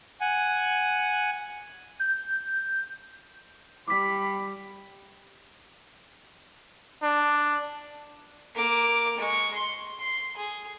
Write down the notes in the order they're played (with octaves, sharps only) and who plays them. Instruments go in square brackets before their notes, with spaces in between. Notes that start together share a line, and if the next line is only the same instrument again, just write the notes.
[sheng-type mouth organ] F#5 G#5
[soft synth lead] G6
[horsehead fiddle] G3 [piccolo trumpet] B5 [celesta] D6 B6
[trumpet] D4
[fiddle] A#3 D6
G#3 C#6
C6
C6
G#4